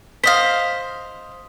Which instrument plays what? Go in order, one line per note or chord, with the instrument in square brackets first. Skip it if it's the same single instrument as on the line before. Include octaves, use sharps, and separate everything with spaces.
[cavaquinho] C5 D#5 F5 [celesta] B6